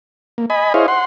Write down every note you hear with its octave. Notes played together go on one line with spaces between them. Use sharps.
A#3
D#5 G#5 B5
E4 G#4 C5 C#5 D#5 F5
F#5 C6